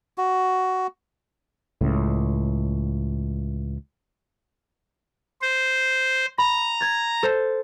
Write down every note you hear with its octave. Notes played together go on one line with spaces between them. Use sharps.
F#4
C#2 A2
C5
A#5 B5
G#6 A6
A4 C5